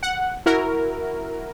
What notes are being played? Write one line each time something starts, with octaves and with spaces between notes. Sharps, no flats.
F#5
E4 F#4 A#4